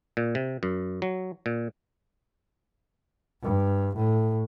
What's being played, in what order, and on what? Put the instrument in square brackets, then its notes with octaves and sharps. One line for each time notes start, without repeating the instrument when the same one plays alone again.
[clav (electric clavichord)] A#2
C3
F#2
F#3
A#2
[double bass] G2
A2